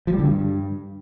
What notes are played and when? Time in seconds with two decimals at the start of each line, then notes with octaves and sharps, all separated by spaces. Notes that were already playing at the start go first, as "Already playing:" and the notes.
0.07 F3
0.13 G3
0.19 D3
0.25 G2